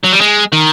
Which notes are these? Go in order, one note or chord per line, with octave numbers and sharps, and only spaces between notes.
F#3
G3
G#3
D#3